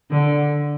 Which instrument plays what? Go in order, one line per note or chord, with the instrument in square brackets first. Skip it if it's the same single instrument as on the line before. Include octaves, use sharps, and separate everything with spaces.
[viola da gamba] D3